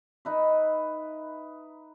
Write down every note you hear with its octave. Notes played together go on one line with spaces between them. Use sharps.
D#4 B4 E5